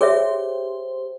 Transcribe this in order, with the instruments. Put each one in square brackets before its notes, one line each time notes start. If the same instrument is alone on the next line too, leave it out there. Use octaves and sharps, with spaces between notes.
[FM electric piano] G4 C5 [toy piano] G#4 C#5 E5